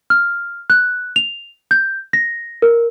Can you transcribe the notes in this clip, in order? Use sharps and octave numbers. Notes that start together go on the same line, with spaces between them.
F6
F#6
F7
G6
A#6
A#4